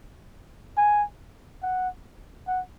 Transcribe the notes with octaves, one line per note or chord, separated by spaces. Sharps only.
G#5
F#5
F#5